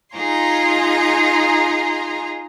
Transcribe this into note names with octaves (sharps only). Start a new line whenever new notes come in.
D#4 F4 G#4 G#5 A#5 C6